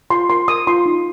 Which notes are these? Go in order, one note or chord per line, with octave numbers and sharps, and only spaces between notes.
F4 C6
A#4 C6
A#4 D#6
F4 C6
D#4